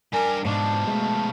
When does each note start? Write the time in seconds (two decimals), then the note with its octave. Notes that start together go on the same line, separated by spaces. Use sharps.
0.13 G2 G3 A#4 G#5
0.45 G#2 B2 F3 D4 A5
0.88 G#3 A3